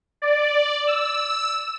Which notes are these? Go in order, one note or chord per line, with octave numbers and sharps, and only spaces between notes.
D5
E6